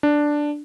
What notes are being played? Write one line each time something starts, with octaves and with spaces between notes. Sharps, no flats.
D4